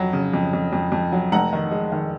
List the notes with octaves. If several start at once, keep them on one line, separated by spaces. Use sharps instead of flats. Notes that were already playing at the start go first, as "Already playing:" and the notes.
Already playing: F2 F#3
C#3
F2
F2
F2
F2
F#3
F1 F#5 A#5
D#3
G#3
D#3